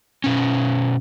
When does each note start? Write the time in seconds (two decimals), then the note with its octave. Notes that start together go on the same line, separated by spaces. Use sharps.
0.24 B2 C#4